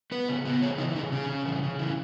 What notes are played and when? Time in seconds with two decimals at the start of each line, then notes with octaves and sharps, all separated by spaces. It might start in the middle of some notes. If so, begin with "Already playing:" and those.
0.12 B3 B4
0.29 C#3
0.45 B3
0.62 C#3 C#5
0.78 E3 D#4
0.95 C#3 D#4
1.12 C#3 C#4
1.29 C#3
1.45 E3
1.63 C#3
1.79 E3